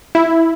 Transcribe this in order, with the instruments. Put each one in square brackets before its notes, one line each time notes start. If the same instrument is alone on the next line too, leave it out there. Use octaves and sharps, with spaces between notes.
[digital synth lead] E4